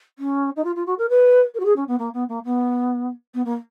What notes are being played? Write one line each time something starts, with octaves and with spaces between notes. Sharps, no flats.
C#4
D#4
F4
F4
F#4
A#4
B4
A#4
F#4
G#4
C#4
B3
A#3
B3
A#3
B3
B3
A#3